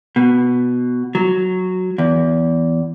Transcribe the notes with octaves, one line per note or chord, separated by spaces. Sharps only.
B2
F#3
E2